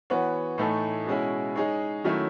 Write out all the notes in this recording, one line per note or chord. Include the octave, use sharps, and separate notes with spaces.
E3 B3 F#4 C#5
A2 E3 A3 D#4 A4
B2 G#3 C#4 E4
G#3 D#4 G#4 C#5
D#3 F#3 A3 C#4 E4